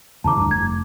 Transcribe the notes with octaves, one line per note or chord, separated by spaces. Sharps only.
E2 C#3 E3 A5 A#5 D6
D2 G2
F1 G#6